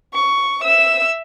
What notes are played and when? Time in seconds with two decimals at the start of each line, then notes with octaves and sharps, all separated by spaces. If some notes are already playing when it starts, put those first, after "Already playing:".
0.14 C#6
0.63 E5 E6